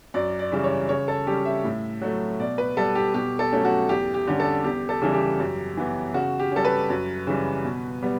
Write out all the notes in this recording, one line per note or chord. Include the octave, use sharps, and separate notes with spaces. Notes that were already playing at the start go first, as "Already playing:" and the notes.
F#2 D5
D5
C#3 E3 G3
C#5
C#3 C#5
A4
G3 C#4 G4
E5
A2
F#3 A3
B2 D5
B4
G3 B3 A4
G4
B2 G4
A4
F#3 A3 C#4
F#4
E2 G4
G4
D3 G3 C#4
A4
E2 G4
A4
C#3 E3 G3
G4
F#2
E3 B3
C#3 F#4
G4
G3 C#4 A4
B4
F#2
C#3 E3 G3
B2
G3 B3